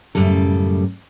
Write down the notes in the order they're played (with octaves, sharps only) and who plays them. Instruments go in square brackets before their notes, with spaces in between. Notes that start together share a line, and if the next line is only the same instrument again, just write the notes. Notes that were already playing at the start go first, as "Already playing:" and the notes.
[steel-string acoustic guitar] F#2 A2 C#3 G3 A4